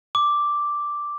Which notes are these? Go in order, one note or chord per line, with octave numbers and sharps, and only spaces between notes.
D6